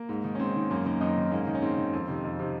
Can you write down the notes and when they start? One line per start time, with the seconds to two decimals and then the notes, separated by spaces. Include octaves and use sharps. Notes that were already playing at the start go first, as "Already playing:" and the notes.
Already playing: A#3
0.09 G#2
0.24 D#3
0.35 C#4
0.39 G#2 C4
0.55 D#3
0.70 F#2 A#3 C#4
0.85 D#3 A#3 C#4
1.01 F#2 C4 D#4
1.17 D#3
1.31 G#2 A#3 C#4
1.47 D#3
1.55 C#4
1.62 G#2 C4
1.78 D#3
1.93 F2
2.08 C3 D#3
2.24 F2
2.39 C3 D#3